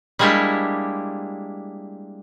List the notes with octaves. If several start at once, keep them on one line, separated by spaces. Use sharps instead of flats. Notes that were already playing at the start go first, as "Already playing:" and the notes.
G3 G#3 A#3 D4 E4 G4